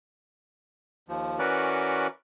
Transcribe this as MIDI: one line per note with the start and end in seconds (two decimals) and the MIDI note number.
1.09 1.39 39
1.09 1.39 53
1.39 2.07 52
1.39 2.07 61
1.39 2.07 66
1.39 2.07 70
1.39 2.07 71
1.39 2.07 74